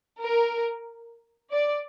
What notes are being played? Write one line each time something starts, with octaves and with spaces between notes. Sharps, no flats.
A#4
D5